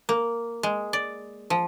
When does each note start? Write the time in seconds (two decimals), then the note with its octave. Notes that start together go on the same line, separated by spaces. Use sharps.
0.09 A#3
0.63 G#3
0.93 D5
1.50 F3